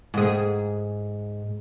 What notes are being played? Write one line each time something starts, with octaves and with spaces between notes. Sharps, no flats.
G#2 G#4